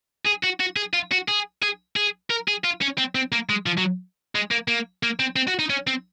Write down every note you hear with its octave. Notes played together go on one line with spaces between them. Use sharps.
G#4
F#4
F#4
G#4
F4
F#4
G#4
G#4
G#4
A#4
G#4
F4
C#4
C4
C4
A#3
G#3
F3
F#3
G#3
A#3
A#3
A#3
C4
C4
F#4
D#4
C#4
C4